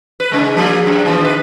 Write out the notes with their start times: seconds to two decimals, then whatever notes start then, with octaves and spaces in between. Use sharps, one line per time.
0.20 B4
0.32 G#2 C#3 G#3
0.57 F3 A#3 G#4
0.86 F#2
1.05 A#2 E3 F3
1.21 D#3 B4